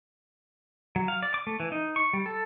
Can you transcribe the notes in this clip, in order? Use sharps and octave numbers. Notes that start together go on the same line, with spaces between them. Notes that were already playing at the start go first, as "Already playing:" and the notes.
F#3
F5
D5
D6
A3
E3
D#4
C#6
G3
A4